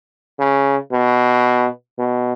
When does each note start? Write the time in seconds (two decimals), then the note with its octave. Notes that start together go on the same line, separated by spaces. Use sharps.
0.39 C#3
0.92 B2
1.99 B2